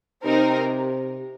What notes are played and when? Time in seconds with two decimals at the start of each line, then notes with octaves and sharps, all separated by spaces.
0.24 C3 C4 D#4 A#4